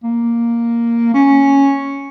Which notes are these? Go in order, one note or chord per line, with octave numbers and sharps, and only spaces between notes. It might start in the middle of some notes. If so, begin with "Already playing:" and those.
A#3
C#4